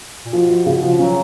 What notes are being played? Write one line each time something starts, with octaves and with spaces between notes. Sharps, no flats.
A#2
B2 F3
F3
C#3
F3
F#3 C#4